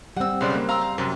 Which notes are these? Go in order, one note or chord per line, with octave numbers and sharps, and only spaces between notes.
G3 C4 F#5 E6
B1 C#3 B4 C5 D5
A#3
F5 G5 A#5 C6 E6 F6
C5
F#2 C3 A5